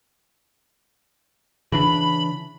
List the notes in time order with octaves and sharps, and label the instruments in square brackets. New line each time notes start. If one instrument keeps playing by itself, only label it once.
[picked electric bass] C#3 E3 D4 [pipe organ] B5